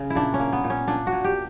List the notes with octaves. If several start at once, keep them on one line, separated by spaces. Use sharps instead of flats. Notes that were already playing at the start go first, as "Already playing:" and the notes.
Already playing: C#3
E4
A#2 D4
C#4
A#3
B3
A#2
C#4
A#2 D4
F#4
A#2
G4